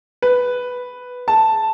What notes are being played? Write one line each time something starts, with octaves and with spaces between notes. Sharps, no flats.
B4
A5